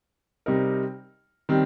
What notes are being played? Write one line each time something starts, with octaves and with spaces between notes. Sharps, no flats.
C3 G3 C4 D#4 A#4
D#3 G3 C4